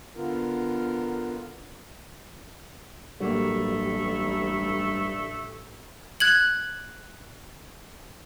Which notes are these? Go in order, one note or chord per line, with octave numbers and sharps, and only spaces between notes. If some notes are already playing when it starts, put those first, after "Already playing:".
D3 B3 F4 A#4
A1 G2 F#3 A3 A#3 G4
F#6 G#6 F#7